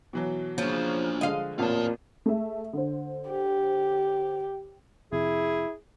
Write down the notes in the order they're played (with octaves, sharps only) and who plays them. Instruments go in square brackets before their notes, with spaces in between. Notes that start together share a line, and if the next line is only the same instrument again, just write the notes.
[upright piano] B2 E3 F#3
[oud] C#3 F3 [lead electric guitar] A#3 D4
[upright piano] D3 G#3 [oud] D#5 F5
[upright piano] A1 F2 [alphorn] A#2 [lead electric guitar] F4 A5
[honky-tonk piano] A3 G#4 E5
D3 C5
[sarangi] G4
[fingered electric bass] F2 C3 [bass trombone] E4 [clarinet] G#4